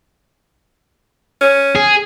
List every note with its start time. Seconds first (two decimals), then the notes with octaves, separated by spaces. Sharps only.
1.41 C#4
1.76 G#4